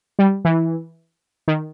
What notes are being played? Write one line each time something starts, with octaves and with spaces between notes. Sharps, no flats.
G3
E3
D#3